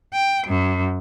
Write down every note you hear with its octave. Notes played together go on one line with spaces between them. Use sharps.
G5
F#2